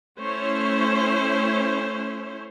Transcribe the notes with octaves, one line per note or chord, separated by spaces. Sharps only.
A3 C#4 E4 C5 C#5